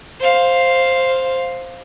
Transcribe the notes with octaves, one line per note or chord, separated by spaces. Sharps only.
C5 F5